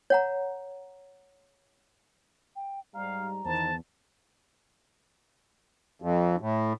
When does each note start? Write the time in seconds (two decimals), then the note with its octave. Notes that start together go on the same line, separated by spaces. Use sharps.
0.10 C#5 F#5 A#5
2.56 G5
2.94 G#2 G3 F5 A#5
3.45 E2 D#3 C5 A5
6.02 F2
6.41 A2